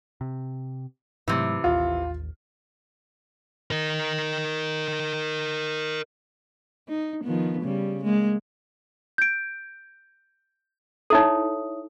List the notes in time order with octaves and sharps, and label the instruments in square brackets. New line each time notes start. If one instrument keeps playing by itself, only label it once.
[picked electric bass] C3
[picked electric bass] G#2 F#3 A3 [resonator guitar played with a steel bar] C3 E3
[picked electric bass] A1 D#2 [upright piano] F4
[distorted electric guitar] A#4 D#5
[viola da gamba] D#4
D#3 F3 B3
C#3 G3
G#3 A#3
[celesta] G6 D7
[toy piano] D#4 E4 A4 [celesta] C#5 E5 D#6